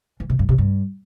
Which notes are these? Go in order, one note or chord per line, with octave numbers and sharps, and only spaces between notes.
E3
C3
G2
C3
G2